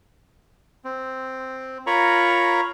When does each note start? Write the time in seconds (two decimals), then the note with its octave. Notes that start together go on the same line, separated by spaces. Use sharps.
0.85 C4
1.87 F4 A#4 C#5 A#5 B5 C#6